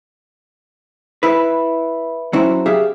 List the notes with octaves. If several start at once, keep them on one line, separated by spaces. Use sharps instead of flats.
E4 B4
F#3 C#4 E4 F#4 C5
G4 G#4 E5 F5